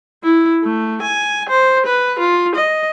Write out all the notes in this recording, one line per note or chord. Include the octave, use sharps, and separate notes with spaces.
E4
A3
G#5
C5
B4
F4
D#5